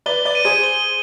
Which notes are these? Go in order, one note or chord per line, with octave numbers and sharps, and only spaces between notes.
B4 D5 G7
B4 D5
D#7
G#4 C5
G7